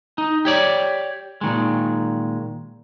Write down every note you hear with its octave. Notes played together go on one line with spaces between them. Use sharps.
D#4
G4 C#5 D5
A#2 D#3 G#3